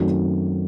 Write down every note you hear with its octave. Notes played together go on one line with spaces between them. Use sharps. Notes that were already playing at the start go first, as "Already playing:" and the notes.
Already playing: F#2 D#3 A3 C4 F#4